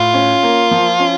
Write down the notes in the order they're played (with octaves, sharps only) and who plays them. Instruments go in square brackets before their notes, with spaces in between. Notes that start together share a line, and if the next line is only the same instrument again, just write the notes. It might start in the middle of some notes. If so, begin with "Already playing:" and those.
Already playing: [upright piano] A2 [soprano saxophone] F4
[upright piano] C#4
A#3
F3
C#4